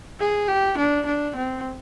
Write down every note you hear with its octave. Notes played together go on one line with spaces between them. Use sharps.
G#4
G4
D4
D4
C4